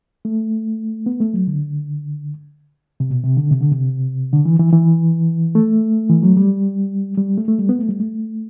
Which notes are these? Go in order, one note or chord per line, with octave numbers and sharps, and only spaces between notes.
A3
B3
A3
F#3
D3
C3
B2
C3
D3
C3
D3
C3
D3
E3
E3
E3
A3
E3
F#3
G3
G3
A3
A3
G3
B3
A3
G3
A3